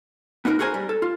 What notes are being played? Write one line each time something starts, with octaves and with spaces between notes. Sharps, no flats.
B3 D#4 F#4 G#4 A#4
F#4 G#4 A#4 C5 G#5
G3
A4
F4